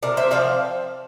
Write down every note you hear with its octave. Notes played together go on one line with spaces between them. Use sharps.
C3 A#4 D5
C5 E5
F3 C4 D5 F5